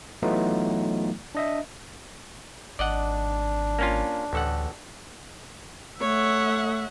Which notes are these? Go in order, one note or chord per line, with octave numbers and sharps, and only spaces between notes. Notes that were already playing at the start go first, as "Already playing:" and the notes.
E3 F#3 A3 B3 D#4 F4
D4 D#5 E5
G#1 D4 D5 D#5 F#5
A#3 C#4 F4
A1 D2 A4 F#5
A3 C#5 E5 F#5